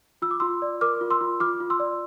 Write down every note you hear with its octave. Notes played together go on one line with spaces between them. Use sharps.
F4 E6
D6
F4 C6 E6
D5
A#4 D6 F6
F4
C6 E6
F4
F4 D6 F6
F4
C6 E6
D5